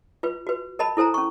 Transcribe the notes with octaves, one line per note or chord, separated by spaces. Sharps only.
F4 B4
F#4 B4
A#4 D#5 A5 B5
E4 A4 C5 G#5 A#5
C#4 C#6